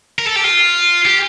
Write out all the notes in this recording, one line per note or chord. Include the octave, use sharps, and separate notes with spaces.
A#4
A4
G4
F4
G4